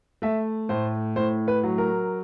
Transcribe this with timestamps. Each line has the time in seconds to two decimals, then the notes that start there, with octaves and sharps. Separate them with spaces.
0.22 A3 E5
0.69 A2 C5
1.16 A2 C5
1.48 B4
1.63 F#3
1.78 A#4